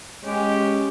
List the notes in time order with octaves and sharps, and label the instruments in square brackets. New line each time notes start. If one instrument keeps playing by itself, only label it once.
[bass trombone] G#3 [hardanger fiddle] C#4 G4